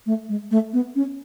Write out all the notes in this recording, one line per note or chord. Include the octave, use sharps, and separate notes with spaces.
A3
G#3
A3
B3
C#4